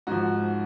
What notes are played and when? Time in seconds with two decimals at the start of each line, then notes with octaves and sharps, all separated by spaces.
0.07 G#2 F3 F#4